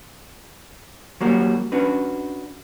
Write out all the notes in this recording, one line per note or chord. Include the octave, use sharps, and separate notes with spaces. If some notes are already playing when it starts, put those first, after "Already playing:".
F#3 G3 A#3 F#4
C#4 D4 F#4 B4